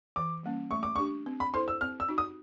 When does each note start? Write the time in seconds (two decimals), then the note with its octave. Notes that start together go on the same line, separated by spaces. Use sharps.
0.16 E3 D6
0.43 G3 A#3 C#4
0.71 A3 C#6
0.83 D6
0.96 D4 G4 C#6
1.26 C4
1.40 B5
1.54 E4 A4 C5 C6
1.68 E6
1.81 C4 F6
2.00 E6
2.09 D#4 F#4
2.18 D#6